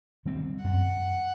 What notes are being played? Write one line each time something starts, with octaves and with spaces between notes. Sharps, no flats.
D#3 G3 C4
F#2 F#5